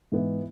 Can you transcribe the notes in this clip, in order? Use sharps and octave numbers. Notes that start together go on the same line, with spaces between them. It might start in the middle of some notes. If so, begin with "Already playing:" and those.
G#2 E3 B3 E4